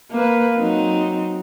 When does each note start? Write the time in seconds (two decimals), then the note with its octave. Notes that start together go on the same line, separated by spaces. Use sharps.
0.11 A#3 B4
0.57 F#3 C4 D#4